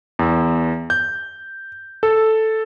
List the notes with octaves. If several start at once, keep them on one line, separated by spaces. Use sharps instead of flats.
E2
G6
A4